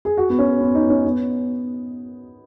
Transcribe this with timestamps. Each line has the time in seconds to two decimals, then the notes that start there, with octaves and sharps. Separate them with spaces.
0.05 G#4
0.17 F#4
0.30 B3
0.39 C#4
0.61 B3
0.75 D#4
0.90 C#4
1.05 B3